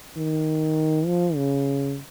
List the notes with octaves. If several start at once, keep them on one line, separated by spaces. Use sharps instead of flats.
D#3
F3
C#3